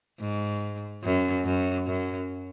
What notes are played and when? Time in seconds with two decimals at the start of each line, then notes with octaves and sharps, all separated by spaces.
0.20 G#2
1.03 F#2
1.45 F#2
1.86 F#2